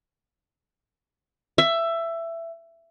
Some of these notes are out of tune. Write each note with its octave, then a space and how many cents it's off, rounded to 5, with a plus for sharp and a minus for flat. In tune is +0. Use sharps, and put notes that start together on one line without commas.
E5 +15